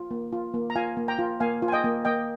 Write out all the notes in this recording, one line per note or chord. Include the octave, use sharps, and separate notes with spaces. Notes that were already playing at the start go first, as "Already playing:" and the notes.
Already playing: F4
A#3
F4
A#3
A#5
F4 F5 G#5
A#3
G5 A#5
F4
A#3 F5 G#5
F4
G#5
D#5 G5
A#3
A#3 D#5 G5